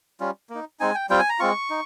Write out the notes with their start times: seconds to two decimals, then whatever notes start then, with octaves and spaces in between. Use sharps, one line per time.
0.20 G3 C#4 F4
0.50 A#3
0.55 D#4
0.80 G#3 C4 D#4 G#5
0.95 G5
1.10 G3 C4 F4 G5
1.19 G#5
1.29 A#5
1.39 G#3 C4 F4 C#6
1.70 D#4